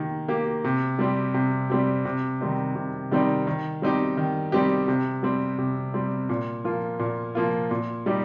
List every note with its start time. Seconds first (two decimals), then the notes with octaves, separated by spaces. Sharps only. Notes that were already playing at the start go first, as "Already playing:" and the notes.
Already playing: D#3 A#3 G4
0.28 A#3 G4
0.64 C3
0.99 G3 C4 G4
1.34 C3
1.70 G3 C4 G4
2.05 C3
2.41 D#3 G3 C4 D#4
2.75 C3
3.11 D#3 G3 C4 D#4
3.47 D#3
3.82 G3 C4 D#4 G4
4.17 D#3
4.52 G3 C4 D#4 G4
4.88 C3
5.23 G3 C4
5.58 C3
5.94 G3 C4
6.29 A#2
6.64 F3 A#3 F4
7.00 A#2
7.35 F3 A#3 F4
7.71 A#2
8.06 G3 D#4 G4